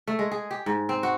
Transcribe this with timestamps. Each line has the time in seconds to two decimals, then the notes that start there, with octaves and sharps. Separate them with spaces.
0.07 A3
0.19 G#3
0.31 G#4
0.51 G4
0.66 G#2
0.89 C4
1.03 F#4